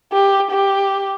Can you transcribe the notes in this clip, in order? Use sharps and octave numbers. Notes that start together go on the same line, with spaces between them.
G4
G4